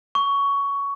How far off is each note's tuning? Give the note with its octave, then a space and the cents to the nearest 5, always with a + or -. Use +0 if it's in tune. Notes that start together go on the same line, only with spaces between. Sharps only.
C#6 +15